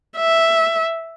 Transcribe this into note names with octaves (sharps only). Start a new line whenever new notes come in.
E5